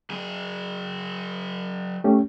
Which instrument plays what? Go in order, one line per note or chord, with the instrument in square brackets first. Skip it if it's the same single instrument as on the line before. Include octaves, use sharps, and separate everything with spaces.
[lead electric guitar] F#3 G#4
[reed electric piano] A3 C#4 G4